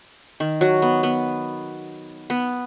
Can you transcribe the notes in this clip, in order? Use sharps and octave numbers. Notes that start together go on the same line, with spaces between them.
D#3
F#3
B3
B3
B3